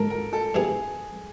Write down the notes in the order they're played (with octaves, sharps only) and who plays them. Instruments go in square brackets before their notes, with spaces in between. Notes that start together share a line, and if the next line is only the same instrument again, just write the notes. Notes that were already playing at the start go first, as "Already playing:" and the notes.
Already playing: [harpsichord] G#2 D#3 G#3 [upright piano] A4 A#4
[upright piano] A#4
A4
[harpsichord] G2 E3 G3 B3 D#4 [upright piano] G#4